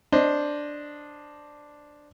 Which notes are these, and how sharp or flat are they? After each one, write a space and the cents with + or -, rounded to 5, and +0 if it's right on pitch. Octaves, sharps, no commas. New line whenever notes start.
D4 +0 C5 +0 D#5 -5